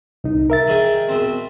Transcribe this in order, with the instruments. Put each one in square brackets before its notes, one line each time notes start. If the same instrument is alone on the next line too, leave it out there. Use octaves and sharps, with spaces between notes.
[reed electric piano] C2 D#4
A#4 E5 A6
[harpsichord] D#3 G#4 G5
B2 C4